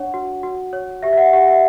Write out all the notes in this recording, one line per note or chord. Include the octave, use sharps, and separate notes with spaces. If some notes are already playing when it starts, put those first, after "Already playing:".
Already playing: D4 C#5 F#5
F#4
F#4
C#5
G4 E5
E5
F#5
G4 F#5
E5